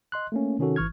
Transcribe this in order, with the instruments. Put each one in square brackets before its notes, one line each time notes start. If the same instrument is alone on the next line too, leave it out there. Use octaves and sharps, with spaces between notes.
[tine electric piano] D#5 C6 F#6
A3 A#3 C#4
C3 D#3 C#4 D#4 F#4 A4
G#1 E3 C#6 F6 G#6